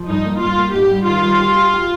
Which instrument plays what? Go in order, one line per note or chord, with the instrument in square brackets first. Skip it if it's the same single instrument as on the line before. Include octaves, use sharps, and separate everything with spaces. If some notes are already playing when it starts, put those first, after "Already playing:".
Already playing: [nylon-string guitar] F3
[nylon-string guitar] G2 [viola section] D#4
[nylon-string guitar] A#3
[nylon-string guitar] G2 [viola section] F4
[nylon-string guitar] A#3
[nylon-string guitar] G#2 [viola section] G4
[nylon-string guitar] G3
[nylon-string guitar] D#3 [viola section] F4
[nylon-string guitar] G3
G4
G4
G4